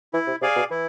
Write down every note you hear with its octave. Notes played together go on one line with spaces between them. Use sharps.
E3 E4
C3
C3 G#4 D5 F5 G#5
B2
E3 E4